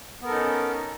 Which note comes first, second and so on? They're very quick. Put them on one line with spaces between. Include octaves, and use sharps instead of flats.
B3 A#4 A4 D#4 C#4